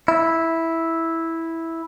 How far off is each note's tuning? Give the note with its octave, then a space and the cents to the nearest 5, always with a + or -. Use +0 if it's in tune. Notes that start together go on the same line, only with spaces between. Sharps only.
E4 -5